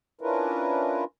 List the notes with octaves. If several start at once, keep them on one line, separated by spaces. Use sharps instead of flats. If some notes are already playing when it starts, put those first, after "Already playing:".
C#4 D4 E4 F4 A#4 B4